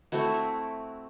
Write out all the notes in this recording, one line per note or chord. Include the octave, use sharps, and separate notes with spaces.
A3 C4 E4 F#4